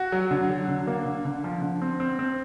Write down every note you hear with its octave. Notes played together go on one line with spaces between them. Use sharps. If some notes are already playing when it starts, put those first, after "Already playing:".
Already playing: F#4
F#3
D3
F#3
D3
A#3
D3
D3
F3
D3
C4
C4
C4